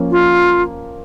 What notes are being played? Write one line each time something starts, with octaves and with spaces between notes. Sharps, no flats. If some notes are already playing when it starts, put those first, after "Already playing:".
Already playing: F3 A#3 C#4
F4